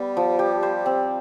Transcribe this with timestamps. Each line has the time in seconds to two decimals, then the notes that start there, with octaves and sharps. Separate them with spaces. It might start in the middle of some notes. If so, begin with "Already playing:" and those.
Already playing: G3 B3
0.17 F3
0.39 G4
0.63 C5
0.86 C4